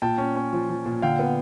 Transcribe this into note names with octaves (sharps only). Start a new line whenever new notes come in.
A#2 G5 A5
C#4
C#4
F3
F3
A#2
D3 F5 G5
B3